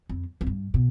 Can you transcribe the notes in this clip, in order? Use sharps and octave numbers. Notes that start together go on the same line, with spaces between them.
F2
F2
G2
B2